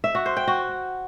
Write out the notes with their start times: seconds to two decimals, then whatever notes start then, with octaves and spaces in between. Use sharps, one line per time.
0.04 E5
0.15 F#4
0.26 C5
0.37 G5
0.47 F#4